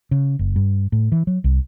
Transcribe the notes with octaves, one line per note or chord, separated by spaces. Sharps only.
C#3
F#1
G2
A2
E3
F#3
C2